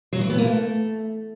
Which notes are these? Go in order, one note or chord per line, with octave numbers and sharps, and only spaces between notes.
F#3
E3
B3
A#3
A3